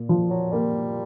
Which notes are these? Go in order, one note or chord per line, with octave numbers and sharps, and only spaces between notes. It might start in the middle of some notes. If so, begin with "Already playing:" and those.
Already playing: A#2
F3
F#3
G3 A#3